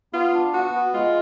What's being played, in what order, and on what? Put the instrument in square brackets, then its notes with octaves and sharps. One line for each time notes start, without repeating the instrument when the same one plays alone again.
[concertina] B3 [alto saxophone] F4
[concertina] D4
[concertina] B3 [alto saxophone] F#4
[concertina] B3
[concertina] G#3 [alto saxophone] F4